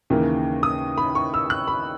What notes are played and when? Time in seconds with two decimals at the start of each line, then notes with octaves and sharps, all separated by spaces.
0.10 D#2 C#3 E3 A#3
0.63 D#6
0.98 B5
1.15 C#6
1.34 E6
1.50 F#6
1.68 B5